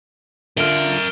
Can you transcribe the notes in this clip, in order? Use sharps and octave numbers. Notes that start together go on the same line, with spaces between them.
D3 F4 A#4 E5 F6 D7 G7